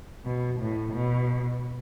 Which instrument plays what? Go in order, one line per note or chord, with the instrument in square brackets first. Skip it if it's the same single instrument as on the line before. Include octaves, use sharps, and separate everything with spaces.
[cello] B2
A2
B2